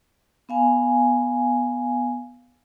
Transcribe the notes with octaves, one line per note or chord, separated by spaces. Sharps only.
B3 F5 G#5